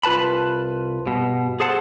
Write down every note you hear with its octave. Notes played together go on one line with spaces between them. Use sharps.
C2 F4 B4 A5 B5
G2 B2
G#4 A4 C5 F#5 A5